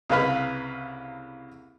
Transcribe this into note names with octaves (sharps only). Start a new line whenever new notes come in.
C2 C#3 A#3 B4 F5 B5